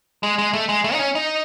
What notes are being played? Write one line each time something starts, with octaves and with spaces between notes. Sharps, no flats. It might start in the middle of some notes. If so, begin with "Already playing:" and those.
G#3
G#3
A3
G#3
A3
D#4
C#4
D#4